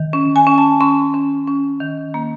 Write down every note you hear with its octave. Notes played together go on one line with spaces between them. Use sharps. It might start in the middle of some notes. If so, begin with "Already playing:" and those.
Already playing: D#3
C#4
G#5
C#4
A5
C#4 C6
C#4
C#4
D#3
A#3